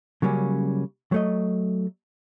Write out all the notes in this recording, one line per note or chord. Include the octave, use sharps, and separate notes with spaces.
C#3 F#3 G3 A#3 C#4
F#3 A3 D#5